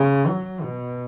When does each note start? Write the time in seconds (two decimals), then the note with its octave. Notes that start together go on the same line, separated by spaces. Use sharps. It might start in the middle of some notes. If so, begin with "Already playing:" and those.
Already playing: C#3
0.27 F#3
0.63 B2